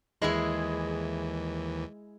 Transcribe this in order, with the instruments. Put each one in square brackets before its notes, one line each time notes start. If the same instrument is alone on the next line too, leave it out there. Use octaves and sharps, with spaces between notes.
[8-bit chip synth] D#2 E3 [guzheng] G#3 E4 G#4